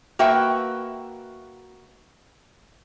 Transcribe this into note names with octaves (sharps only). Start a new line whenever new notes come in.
A#3 F#4 B4 E5 G5